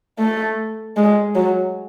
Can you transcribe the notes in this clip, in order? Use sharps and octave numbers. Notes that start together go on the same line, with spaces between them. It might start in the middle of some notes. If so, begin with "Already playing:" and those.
A3
G#3
F#3